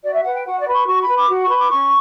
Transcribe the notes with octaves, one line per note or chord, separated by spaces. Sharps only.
F#4 D5
E5
B4 F#5
G5
F#4 F#5
D5
B4
C#6
F#4 C#6
B5
B4
D6
F#4
C#6
B4
D6
C#4 C#6